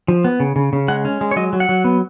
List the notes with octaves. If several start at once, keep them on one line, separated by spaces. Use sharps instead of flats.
F3
B3
C#3
C#3
C#3
G#3 F#5
C#4
G#3
C#5
F#3 D#5
F#3
F#5
F#3
B3